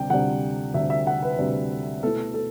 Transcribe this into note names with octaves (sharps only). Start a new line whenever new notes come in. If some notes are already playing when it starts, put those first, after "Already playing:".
Already playing: D2 C3 G3 D4 G5
D2 C3 G3 D4 F#5
D2 C3 G3 D4 E5
E5
F#5
B4
D2 C3 G3 D4
B2 A3 E4 A4
A4